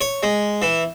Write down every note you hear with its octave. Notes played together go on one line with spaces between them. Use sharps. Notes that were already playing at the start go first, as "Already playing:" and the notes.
C#5
G#3
E3